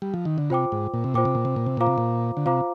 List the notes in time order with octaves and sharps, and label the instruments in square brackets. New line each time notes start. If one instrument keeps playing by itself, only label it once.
[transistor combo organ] G3
F3
D#3
D3
[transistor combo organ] C3 [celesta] F4 C5 G5 D6
[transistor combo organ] G#2
A#2
C3
[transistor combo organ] A#2 [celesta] F4 C5 G5 D6
[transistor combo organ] C3
A#2
C3
A#2
C3
[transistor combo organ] A#2 [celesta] F4 C5 F5 A#5 D6
[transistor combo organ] C3
A#2
D3
[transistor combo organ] C3 [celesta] F4 C5 F5 A#5 D6